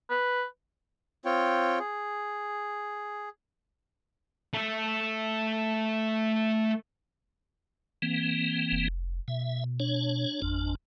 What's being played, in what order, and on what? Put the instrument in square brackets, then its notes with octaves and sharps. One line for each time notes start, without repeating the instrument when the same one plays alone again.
[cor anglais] B4
[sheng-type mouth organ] C4 F4 C#5 G5
G#4
[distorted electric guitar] A3 A4
[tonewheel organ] E3 A#3 C4
[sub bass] F1
[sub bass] B2 [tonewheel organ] E5
[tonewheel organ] D4 C#5
G#1 F2 D4